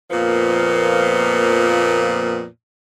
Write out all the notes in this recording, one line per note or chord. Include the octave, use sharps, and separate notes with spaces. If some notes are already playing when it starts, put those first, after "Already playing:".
F2 A#2 F3 A#3 B3